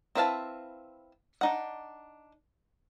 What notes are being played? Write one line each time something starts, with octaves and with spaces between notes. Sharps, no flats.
C4 E4 B4 F5 A5
D4 D#4 F#5